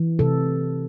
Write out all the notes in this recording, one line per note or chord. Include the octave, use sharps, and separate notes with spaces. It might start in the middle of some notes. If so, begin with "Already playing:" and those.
Already playing: E3
C3 A4